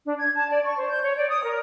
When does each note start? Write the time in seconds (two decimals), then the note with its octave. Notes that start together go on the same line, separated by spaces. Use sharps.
0.06 D4
0.19 G#6
0.35 A5
0.50 D5
0.64 C#6
0.77 C5
0.90 G6
1.03 C#5
1.16 D5
1.29 D#6
1.43 A#4